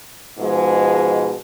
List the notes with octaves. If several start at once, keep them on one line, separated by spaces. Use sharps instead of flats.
G#2 B2 F3 G#3